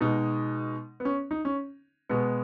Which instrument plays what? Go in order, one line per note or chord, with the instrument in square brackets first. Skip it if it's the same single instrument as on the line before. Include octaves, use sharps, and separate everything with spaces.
[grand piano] B2 G#3 D#4
B3
C#4
D#4
C#4
B2 G#3 B3